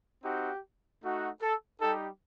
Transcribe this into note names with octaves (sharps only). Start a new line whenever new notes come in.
C4 D#4 F#4 G4
A3 D#4 F#4
A4
G3 D#4 G4 A4